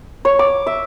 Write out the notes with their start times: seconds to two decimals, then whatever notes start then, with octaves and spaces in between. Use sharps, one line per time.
0.25 C#5
0.39 D6
0.66 E5